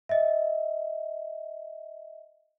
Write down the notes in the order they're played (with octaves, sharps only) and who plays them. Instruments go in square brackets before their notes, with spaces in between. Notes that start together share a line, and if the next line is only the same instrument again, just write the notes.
[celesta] D#5 E5